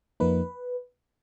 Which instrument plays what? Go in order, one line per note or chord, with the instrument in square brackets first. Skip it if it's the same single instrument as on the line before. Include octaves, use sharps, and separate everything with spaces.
[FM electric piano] F2 F3 A#3 D#4 B4